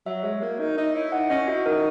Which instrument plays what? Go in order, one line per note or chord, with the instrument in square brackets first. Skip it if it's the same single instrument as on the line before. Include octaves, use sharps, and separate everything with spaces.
[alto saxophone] F#3 [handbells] E5
[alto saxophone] G#3 [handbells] C#5
[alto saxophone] A#3 [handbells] F#4
[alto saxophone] D#4 [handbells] A#4
[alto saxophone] D#4 [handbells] E5
[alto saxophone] E4 [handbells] C#5
[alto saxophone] D#4 [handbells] F#5
[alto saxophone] C#4 [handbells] D#5
[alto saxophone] E4 [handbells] F#4
[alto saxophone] D#4 [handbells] A#4